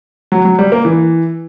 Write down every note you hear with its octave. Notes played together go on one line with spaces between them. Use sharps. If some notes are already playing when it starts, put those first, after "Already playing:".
F#3
F#3
G3
A#3
E3